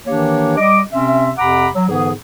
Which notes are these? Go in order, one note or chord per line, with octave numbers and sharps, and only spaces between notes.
D#3 E3 A#3 D4 G4 C#5
G3 D#5 D6
C3 C4 C#4 E5
F2 C3 F#5 A#5 B5 D6
F#3
G#2 D3 E3 B3 G#4